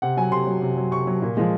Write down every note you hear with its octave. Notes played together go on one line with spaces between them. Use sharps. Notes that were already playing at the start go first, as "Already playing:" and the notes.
C3 F#5
F#3 G#5
C3 C6
F#3
C3
F#3
C3 C#6
F#3
A#2
F3 G#3